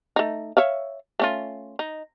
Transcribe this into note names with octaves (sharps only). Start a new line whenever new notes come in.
A3 D#4
C#5 E5 F5
A3 C#4 F4
D#4